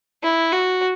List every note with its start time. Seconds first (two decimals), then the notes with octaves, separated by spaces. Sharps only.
0.23 E4
0.52 F#4